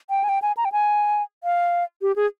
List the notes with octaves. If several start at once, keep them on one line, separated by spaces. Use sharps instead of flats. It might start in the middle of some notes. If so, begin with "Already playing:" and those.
G5
G#5
G5
G#5
A#5
G5
G#5
F5
G4
G#4